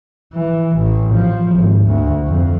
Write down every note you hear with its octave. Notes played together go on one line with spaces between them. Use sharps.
E3
A1
F3
G#1
D2
F2